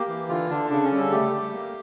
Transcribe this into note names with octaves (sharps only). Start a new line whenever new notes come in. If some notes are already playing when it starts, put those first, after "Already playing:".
Already playing: A#3 G4
E3
D3 F4
D3 D4
C#3 D4
C#4
G3
A4
A3 G4
A3
A#3